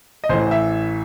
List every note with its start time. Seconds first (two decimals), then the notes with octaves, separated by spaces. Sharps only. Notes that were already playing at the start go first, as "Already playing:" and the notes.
0.24 D#5
0.29 A1 A2 E3 C5
0.51 E5